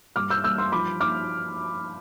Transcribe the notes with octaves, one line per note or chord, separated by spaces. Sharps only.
G2 D6 F6
E6 G6
G2 E6 G6
C6 E6
F3 B5 D6
D6 F6